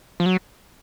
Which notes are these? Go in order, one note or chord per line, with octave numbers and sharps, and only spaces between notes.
F3
F#3